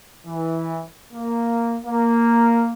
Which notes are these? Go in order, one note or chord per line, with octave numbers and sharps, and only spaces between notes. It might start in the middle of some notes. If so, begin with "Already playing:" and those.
E3
A#3
A#3